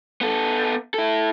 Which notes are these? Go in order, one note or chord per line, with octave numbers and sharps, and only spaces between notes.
B3 A4
E4 A4